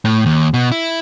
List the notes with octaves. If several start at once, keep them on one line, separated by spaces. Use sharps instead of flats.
A2
D#2
B2
E4